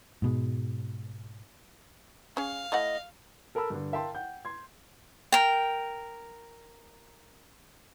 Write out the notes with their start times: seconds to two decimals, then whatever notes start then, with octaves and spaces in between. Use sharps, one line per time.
0.22 G#2 B2 G#3
2.37 C#4 G#4 F5
2.72 A3 E4 D#5 F#5
3.55 A4 A#4 A5 B5 E6
3.70 G2 D3
3.93 A#4 E5 F5 G5 A5 C6
4.15 F#5 G5 G6
4.45 C6 G#6
5.32 A#4 G5